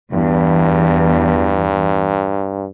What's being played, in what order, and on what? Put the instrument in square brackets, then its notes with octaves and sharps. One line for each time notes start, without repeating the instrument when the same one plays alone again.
[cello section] E2 [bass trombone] G2